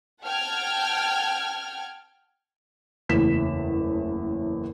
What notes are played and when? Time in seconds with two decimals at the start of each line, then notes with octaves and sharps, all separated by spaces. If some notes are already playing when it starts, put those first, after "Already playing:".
0.24 F#5 G5 A5 F6 G#6
3.09 F#1 E2 A2 B6 E7